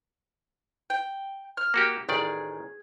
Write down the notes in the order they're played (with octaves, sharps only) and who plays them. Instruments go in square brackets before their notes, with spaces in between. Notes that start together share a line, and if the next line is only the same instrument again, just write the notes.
[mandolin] G5
F6
[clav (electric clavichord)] A#3 F#4 G4
[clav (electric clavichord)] A1 D#3 D5 [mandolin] G#4